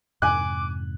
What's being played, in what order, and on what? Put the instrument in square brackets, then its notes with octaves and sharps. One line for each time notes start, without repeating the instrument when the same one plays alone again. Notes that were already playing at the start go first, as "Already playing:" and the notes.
[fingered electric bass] F2 G#2 C3 [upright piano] G#5 F#6 [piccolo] D6